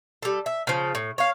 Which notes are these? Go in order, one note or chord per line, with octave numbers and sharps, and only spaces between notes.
G3 A4
E5
C#3 F3
A2
C#5 F5